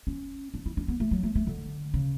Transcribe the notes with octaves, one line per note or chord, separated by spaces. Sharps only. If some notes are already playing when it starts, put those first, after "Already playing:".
C#4
D4
E4
D4
B3
A3
F#3
A3
A3
D3
C#3